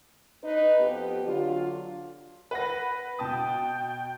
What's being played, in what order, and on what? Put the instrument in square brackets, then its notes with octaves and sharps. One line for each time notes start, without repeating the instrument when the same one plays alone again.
[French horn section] D#4 B4
F2 B3 G4
D3 F#3 F4
[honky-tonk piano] B4 F#5 A#6
[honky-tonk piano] B2 A5 D#6 [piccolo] G5